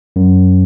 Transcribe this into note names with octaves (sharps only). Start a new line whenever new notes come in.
F#2